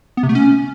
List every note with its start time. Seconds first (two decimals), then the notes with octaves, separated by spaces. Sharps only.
0.17 B3
0.23 C3
0.29 A3
0.35 C#4